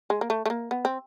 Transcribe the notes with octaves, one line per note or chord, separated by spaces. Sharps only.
G#3
A#3
A3
A3
A#3
B3
C4